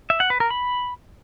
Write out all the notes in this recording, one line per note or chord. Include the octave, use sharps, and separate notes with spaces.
E5
F#5
B4
A#4
B5